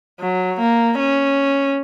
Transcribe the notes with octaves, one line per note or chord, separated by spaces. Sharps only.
F#3
A#3
C#4